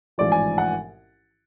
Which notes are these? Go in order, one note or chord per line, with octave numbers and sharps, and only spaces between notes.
A1 G#2 F3 D5
G#5
F#5